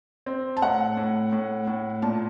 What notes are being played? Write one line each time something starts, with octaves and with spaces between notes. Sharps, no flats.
C4
A5
A2 F#5
A2
A2
A2
A#2 A5